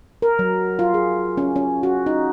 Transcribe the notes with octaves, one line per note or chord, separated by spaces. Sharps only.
A#4
F#3
F4
G#4
C#4
C#4
F#4
D#4